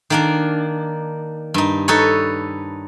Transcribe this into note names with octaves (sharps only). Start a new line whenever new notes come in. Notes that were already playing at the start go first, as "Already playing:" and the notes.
D#3 A#3 D4
G2 D#4
D#4 A4 B4 C#5